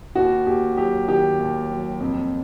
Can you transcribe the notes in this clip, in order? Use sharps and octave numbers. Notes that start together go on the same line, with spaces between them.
D#2 F#4
D#2 G4
F#3 G4
D#3 G4
D#2
F#3
F2